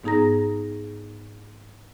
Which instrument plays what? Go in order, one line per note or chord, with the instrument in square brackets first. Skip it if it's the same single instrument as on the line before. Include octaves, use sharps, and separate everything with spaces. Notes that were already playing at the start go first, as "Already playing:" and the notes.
[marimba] G#2 B3 D#4 G#4 A#5 A#6